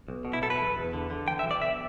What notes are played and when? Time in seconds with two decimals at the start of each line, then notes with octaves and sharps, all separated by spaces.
0.08 B1
0.25 B2
0.33 E4
0.42 B2 A4
0.50 B4
0.60 E2
0.77 E2
0.93 D3
1.10 D3
1.28 E3 G5
1.39 E5
1.45 B1
1.51 D5
1.62 B1 E5